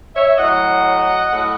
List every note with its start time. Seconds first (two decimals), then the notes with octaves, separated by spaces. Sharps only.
0.15 C#5 E5
0.38 A2 F#3 D#5 F#5
1.29 A2 F#3